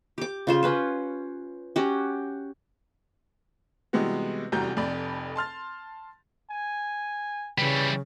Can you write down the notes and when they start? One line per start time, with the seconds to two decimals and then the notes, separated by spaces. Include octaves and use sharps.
0.18 G4 D6
0.47 C#3 F4 C5
0.63 C#4 B4 C5
1.76 C#4 F#4 G4
3.93 C3 E3 G3 G#3 B3 F#4
4.52 F1 E2 G3 F#4 A#5 G6
4.76 F1 F2 D5 B5
5.36 A5 C6 F6 A6
6.51 G#5
7.58 C#3 E3 G3 B4